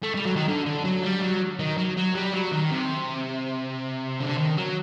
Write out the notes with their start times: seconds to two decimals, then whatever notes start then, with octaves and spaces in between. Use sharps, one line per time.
0.03 A3
0.14 G3
0.25 F#3
0.36 D#3
0.48 D3
0.66 D3
0.85 F#3
1.03 G3
1.22 F#3
1.59 D#3
1.78 F#3
1.97 F#3
2.15 G3
2.33 F#3
2.52 D#3
2.71 C3
4.20 D3
4.38 D#3
4.57 F#3